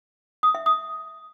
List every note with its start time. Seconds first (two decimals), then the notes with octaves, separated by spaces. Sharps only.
0.43 D#6
0.55 E5
0.66 D#6